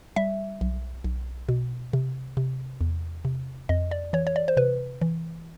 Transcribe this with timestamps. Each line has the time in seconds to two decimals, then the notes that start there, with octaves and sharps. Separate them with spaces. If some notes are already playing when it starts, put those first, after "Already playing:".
0.16 G3 E5
0.61 B1
1.04 B1
1.49 B2
1.93 C3
2.37 C3
2.81 E2
3.25 C3
3.69 F2 D#5
3.91 D5
4.13 E3 C#5
4.27 C#5
4.36 D5
4.48 C5
4.57 C3 B4
5.01 E3